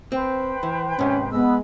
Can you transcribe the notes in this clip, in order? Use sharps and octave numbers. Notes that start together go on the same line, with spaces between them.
C4 B4 C5 G5
E3
G#2 C3 C#4
G#3 B3 B4 D#5 E6